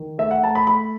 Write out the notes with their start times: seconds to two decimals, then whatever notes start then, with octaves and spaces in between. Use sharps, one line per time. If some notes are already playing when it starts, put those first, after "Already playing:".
Already playing: D#3
0.18 A3 E5
0.31 F#5
0.43 A3 A5
0.55 B5
0.67 A3 B5